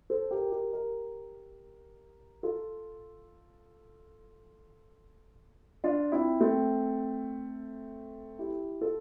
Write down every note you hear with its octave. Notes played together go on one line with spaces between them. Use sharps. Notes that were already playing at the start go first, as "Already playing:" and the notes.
A4 C5
G4 A#4
G4 A#4
G4 A#4
F4 A4
D4 F4
C4 E4
A3 C4
E4 G4
F4 A4